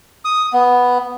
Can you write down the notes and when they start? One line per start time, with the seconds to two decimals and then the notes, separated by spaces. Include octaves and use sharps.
0.25 D#6
0.53 B3